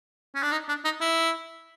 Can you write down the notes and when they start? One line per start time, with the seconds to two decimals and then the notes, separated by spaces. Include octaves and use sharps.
0.35 C#4
0.43 D4
0.52 D#4
0.68 D4
0.85 D#4
1.01 E4